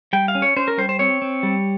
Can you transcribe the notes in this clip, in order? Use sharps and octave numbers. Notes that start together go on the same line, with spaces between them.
G3 G5
F5
C#4
C#5
C#4 C5
A#4
G3 C5
C5
C4 C#5
C4
G3